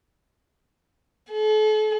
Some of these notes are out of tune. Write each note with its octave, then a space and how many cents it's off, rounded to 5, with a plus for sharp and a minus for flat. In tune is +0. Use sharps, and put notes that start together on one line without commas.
A4 -40